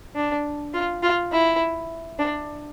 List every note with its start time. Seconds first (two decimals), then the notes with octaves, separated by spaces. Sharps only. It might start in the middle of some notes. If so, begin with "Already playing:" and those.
0.16 D4
0.73 F4
1.03 F4
1.32 E4
2.19 D4